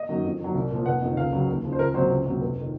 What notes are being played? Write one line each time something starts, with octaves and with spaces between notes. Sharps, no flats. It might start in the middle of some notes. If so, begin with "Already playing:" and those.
Already playing: D#5
F#2 D#3 F#3
F2
D#3 F#3
C2
A#2 F3
F1 F#5
F2 D#3
C#2 F5
C#3 F#3
D#2
C#3 F3
C5
C#2 A#4
C3 F#3 C5
C#2
C3 F#3
F1
D#3